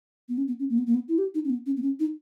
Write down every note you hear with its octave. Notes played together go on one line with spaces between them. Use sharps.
B3
C#4
B3
C#4
A#3
B3
A#3
B3
E4
G4
D#4
C#4
B3
C#4
B3
C#4
D#4